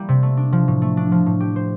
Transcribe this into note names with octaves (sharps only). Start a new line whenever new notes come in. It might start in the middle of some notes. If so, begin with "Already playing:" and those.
Already playing: G3 A#3 E4
C3
A3
D4
F3
A2
A3
D4
F3
A2
G4
C5